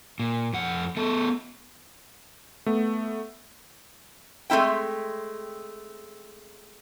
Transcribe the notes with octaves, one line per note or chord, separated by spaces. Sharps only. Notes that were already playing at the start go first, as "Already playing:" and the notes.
A#2
F2 F#5
A3 B3 A4
A3 B3
G#3 A3 C4 E4 G5